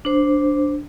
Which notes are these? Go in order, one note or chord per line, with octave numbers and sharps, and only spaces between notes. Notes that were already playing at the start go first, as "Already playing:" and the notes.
D4 C5